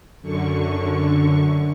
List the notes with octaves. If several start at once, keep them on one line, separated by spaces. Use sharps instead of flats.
F#2 D3 C#6